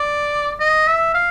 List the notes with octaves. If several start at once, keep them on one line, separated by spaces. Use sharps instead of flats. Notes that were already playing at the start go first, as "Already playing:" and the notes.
Already playing: D5
D#5
E5
F5